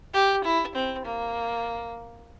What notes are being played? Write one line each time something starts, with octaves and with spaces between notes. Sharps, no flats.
G4
E4
C4
A#3